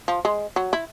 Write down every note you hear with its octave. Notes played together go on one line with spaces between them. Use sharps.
F3
G#3
F#3
E4